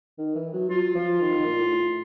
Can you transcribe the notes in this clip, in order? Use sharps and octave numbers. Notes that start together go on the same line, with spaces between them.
D#3
E3
F#3
F#3 F4
F3
D#3
D#3
A#2
A2
A2